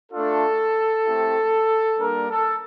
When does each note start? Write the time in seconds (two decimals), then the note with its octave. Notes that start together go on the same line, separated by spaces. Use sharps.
0.12 A3 D4 F4 A4
1.05 A3 C4 E4 G4
1.98 G3 A#3 D4 A#4
2.29 A4